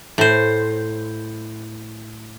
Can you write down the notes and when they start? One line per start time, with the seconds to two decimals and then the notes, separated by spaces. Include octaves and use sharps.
0.18 A2 C5